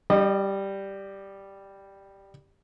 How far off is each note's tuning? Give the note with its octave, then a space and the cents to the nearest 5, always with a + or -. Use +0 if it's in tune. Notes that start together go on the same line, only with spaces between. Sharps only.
G3 +0 D#5 -35